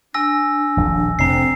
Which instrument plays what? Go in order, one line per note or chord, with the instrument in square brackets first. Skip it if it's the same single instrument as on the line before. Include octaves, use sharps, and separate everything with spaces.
[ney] D4 [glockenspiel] G#5 E6 A#6
[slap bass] D#1 A#1 F3
[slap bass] F1 D4 [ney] C4 [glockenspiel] A#5 C7